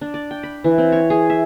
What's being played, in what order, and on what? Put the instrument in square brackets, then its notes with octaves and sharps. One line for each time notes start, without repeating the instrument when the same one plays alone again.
[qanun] D4
D5
G5
B5
E3
C4
C#5
G#4
E5